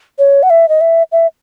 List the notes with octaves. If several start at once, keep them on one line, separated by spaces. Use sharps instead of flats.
C#5
F#5
E5
D#5
E5
E5